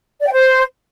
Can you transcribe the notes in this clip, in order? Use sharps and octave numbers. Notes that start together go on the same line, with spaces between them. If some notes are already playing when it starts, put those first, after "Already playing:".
D5
G5
C5